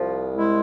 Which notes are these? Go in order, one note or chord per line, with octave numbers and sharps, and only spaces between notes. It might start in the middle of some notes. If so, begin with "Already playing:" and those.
Already playing: C2 F3
G#3 E4